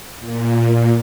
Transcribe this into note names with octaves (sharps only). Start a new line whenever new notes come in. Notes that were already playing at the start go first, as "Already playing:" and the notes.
A#2